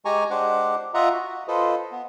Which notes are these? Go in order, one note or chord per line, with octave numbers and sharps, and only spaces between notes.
G#3 G4 G#5 A#5 C#6
G#3 D4 G4 C5 F#5 D6
F4 D#5 E5 F#5 A#5
F#4
F4 A4 B4 C5 D#5
B3